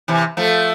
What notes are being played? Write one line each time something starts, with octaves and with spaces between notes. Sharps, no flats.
C3 E3
F3 A3